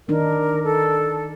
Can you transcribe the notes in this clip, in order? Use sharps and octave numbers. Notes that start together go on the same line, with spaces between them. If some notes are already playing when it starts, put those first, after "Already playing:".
D#3 D4 D#4 A#4
A4